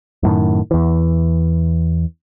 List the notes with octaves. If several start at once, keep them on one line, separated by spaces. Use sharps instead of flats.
F#2 A2 D#3
E2 E3